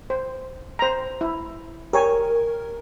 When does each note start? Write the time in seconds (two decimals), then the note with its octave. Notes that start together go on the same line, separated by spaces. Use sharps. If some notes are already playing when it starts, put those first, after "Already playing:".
0.10 C5
0.79 C5 A#5
1.21 E4
1.93 G4 A#4 C#5 G#5